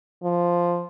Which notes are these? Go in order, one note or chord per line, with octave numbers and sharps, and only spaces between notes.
F3